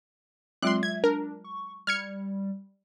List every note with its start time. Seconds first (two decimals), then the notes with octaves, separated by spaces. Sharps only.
0.63 F#3 G#3 C4 F4 C6 F#6
0.83 E5 G#6
1.04 D4 A#4
1.44 C#6
1.87 G3 F6 G#6 C#7